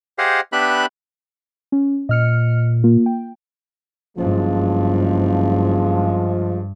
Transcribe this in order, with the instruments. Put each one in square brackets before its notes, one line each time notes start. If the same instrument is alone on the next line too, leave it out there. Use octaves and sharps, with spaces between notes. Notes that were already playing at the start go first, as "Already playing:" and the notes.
[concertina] G4 G#4 C5 D#5 F5 F#5
B3 D4 G4 E5 B5 F#6
[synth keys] C#4
[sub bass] A#2 [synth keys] D#5 F6 C#7
[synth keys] A#3 F4
G5
[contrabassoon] F#1 [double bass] G2 [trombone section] F3 G#3